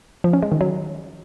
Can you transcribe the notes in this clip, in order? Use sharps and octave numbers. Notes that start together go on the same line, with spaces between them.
F3
C#4
G#3
D#3
F#3